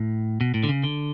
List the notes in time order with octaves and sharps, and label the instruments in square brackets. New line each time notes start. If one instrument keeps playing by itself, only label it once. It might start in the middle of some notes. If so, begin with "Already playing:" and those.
Already playing: [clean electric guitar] A2
B2
A2
D3
C#3
D3